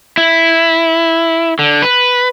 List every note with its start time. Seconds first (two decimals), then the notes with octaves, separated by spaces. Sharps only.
0.17 E4
1.59 D3
1.82 B4